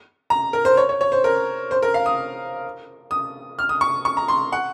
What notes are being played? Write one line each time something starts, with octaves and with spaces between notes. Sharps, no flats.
A#5
A#4
C5
C#5
C#5
C#5
C5
A#4
C5
A#4
F5
D#6
D#6
F6
D#6
C#6
C#6
A#5
C6
F#5